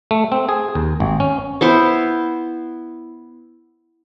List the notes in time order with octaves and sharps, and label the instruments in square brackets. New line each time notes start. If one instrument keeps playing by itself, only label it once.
[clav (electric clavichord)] A3
C4
G#4
D#2
G#1
C#4
[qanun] B3 E4 C5